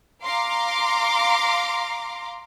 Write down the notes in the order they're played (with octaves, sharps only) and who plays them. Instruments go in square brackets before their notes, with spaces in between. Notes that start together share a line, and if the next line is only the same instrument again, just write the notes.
[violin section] F5 A#5 C6 D6